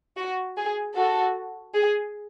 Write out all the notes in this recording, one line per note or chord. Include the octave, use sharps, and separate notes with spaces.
F#4
G#4
F#4 A4
G#4